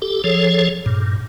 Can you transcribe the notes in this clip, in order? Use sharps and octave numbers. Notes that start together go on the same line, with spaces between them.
G4 A4
F3 G#4 A4 C#5
G2 A#2